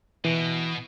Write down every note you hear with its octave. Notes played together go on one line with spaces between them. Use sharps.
B2 E3